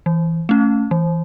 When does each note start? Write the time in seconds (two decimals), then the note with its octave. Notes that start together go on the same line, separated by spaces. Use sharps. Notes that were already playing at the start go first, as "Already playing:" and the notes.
0.06 E3
0.49 A3 C#4
0.91 E3